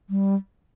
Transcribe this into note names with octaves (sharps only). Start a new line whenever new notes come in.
G3